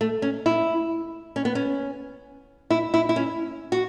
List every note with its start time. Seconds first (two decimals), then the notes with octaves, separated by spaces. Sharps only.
0.01 A3
0.22 C#4
0.46 E4
1.36 C#4
1.45 B3
1.55 C#4
2.70 E4
2.94 E4
3.09 E4
3.16 C#4
3.72 F#4